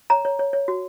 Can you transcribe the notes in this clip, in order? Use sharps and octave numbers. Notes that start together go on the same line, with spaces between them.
C#5 A#5
C#5
C#5
C#5
F#4